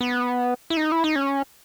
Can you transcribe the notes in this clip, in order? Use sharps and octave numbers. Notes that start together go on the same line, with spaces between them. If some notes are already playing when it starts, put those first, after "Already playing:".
B3
E4
D#4
E4
D#4
C#4